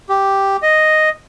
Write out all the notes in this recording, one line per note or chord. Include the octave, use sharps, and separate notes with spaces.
G4
D#5